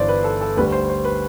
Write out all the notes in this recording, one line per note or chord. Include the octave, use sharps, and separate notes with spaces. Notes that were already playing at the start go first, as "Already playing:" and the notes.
Already playing: G1 G2 E3 G3 C5 D5
B4
A4
A4
D2 D3 G3 B4
C5
C5
B4